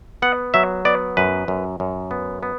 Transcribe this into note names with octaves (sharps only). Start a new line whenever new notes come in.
B3 F#5
F#3 E5
B3 D5
F#2 B4
F#2
F#2
B3
B3